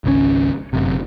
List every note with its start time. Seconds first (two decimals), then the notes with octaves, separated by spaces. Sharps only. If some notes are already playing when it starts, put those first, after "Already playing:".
0.04 G#1 C#2 D#3 C#4
0.73 G1 F#2 C3